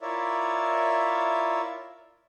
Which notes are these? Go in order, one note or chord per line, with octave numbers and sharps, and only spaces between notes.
E4 F4 A#4 C#5 D5 E5